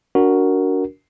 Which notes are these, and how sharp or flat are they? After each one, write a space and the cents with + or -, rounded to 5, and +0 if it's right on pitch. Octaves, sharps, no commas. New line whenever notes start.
D4 -25 F#4 +0 A#4 +0